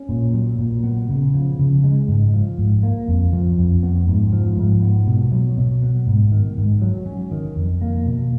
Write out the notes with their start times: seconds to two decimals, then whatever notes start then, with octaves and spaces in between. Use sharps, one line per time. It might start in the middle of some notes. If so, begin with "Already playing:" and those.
Already playing: C#4
0.09 A#2
0.33 F#3
0.59 A#2
0.84 B3
1.09 C#3
1.34 F3
1.59 C#3
1.84 G#3
2.08 G#2
2.34 F3
2.58 G#2
2.83 A#3
3.08 F2
3.33 F3
3.58 F2
3.83 B3
4.07 G#2
4.33 F3
4.57 G#2
4.82 B3
5.07 B2
5.32 F#3
5.57 B2
5.82 B3
6.07 G#2
6.32 D#3
6.57 G#2
6.81 F#3
7.06 C#4
7.31 D#3
7.56 F2
7.81 A#3
8.05 B2